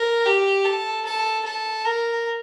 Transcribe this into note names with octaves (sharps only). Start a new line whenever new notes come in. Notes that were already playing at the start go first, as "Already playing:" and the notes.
Already playing: A#4
G4
A4
A4
A4
A#4